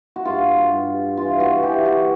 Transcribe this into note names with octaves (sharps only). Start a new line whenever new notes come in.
F#4
G2 F4
G2
E3 F4
F#4
E3 G4
F#4